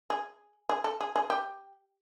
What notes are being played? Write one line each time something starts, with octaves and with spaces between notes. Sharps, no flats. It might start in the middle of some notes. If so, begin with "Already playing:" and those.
G#4
G#4
A4
G#4
G#4
G4